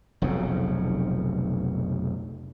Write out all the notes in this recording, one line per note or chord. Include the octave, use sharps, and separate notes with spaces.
F1 B1 F2 C#3